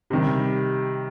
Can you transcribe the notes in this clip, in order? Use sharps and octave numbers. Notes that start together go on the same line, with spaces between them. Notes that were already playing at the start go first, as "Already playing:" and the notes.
C3 D#3 G3